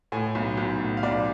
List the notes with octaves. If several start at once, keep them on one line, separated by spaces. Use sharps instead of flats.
A2 G#5
B1
B1
A2
F5
B1 D5